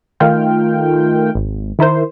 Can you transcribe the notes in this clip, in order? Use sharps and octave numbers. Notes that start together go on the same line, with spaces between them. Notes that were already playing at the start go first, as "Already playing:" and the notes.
D#3 A3 F4 G5 F6
G#1
D#3 E4 A#4 C5